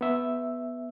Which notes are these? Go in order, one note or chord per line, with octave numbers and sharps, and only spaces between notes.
B3 E5